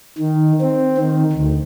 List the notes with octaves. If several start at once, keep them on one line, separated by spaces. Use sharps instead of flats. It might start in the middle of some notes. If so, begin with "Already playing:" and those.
D#3
C4
D#3
D2